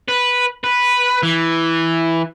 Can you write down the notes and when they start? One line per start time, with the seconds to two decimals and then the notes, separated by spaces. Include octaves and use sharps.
0.09 B4
0.64 B4
1.23 E3